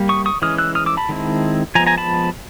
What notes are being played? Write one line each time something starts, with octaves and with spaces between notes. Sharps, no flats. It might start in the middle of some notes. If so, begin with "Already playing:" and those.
Already playing: G3 A#3
C#6 D#6
C#6 D#6
E3 G#3 C#4 D#6 F6
E6 F#6
D#6 F6
D6 E6
A5 B5
D#3 G#3 C4 E4
F3 G#3 B3 G#5 A#5
G#5 A#5
A5 B5